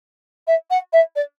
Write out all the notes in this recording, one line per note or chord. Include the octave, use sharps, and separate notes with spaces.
E5
F#5
E5
D5